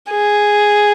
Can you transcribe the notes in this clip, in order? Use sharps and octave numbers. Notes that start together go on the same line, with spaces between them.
G#4